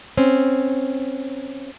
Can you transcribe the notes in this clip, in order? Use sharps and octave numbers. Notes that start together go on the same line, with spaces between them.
C4 C#4